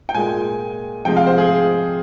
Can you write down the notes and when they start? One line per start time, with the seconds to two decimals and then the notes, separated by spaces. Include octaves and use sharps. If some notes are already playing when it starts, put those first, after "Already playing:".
0.09 G5
0.15 A#2 G#3 G#5
1.05 C3 F3 G#3 G5
1.17 F5
1.27 C5
1.38 G#4